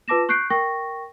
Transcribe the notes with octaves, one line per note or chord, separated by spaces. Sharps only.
F4 B4 A5 D6 A#6 E7
C#6 F#6 G6 C7 D7
A#4 G5 C#6 A#6